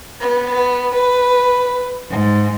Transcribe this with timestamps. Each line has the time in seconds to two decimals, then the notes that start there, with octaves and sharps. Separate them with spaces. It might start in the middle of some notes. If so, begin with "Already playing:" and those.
0.20 B3
0.94 B4
2.09 G#2